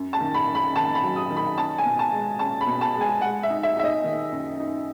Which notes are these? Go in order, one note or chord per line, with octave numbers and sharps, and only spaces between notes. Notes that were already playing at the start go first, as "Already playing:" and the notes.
Already playing: F#2
A5
D#3
B5
F#2
B5
D#3 A5
B5
F#3
D#6
D#3
B5
C#4 A5
G#5
B2
A5
G#3
C#4 A5
B5
B2
A5
G#3
G#5
G#3 F#5
E5
D#4
E5
D#4 E5
D#5
D#3
F#2
D#4